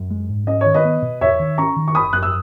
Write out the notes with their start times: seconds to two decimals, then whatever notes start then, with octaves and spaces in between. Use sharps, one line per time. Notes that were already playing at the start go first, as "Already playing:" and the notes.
Already playing: F#2
0.10 G#3
0.29 G#2
0.47 C#4 D#5
0.61 D#3 C#5
0.74 B4 D#5
0.85 B3
1.02 B2
1.21 E2 C#5 E5
1.39 D#3
1.58 C#4 A#5 C#6
1.76 D#3
1.88 C#6
1.95 F#1 B5 D#6
2.13 F#2 F#6
2.23 E6